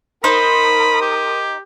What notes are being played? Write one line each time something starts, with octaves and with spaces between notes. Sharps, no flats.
D#4 A#4 C5 B5 D#6
G4